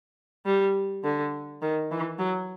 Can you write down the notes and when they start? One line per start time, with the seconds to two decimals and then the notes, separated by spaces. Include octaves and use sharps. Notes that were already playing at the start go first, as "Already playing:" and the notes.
0.46 G3
1.04 D3
1.62 D#3
1.91 E3
2.19 F#3